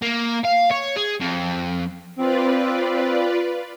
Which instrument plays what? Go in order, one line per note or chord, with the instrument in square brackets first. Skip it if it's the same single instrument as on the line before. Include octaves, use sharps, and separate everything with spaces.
[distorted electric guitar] A#3
F5
C#5
G#4
F2
[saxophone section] C4 [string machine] F4 B4 D5